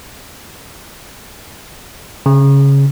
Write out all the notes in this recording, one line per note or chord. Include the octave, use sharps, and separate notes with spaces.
C#3